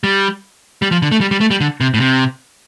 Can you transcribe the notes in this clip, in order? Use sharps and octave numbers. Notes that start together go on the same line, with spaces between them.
G3
G3
F3
D3
A3
G3
G3
A3
G3
D3
C3
A2
C3